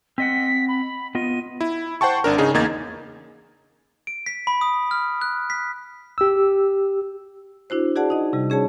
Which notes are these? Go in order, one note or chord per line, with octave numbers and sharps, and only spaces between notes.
C4 D#5 F#5 B6
B5
B3 F4 D#5 D#7
E4
C5 F#5 G5 A5 C#6
G#1 D4 A#4
C#3 D#4 G#4
E2 A#3 D#4 G#6 A6
D7
B6
B5
D#6
F6
F#6
B6
G4 E6
D4 E4 F#4 C5
F#4 G#4 D5 F#5 A5
D#4 D#5
C3 G3
C#4 G#4 C#5 A5